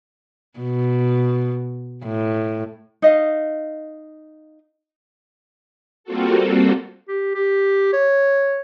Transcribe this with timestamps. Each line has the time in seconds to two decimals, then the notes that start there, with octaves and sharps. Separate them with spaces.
0.59 B2
2.05 A2
3.02 D#4 D#5 F5
6.04 G3 A#3 C4 F4 F#4 A4
7.08 G4
7.35 G4
7.93 C#5